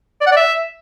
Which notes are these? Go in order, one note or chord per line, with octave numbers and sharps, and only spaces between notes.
D5
F#5
D5
E5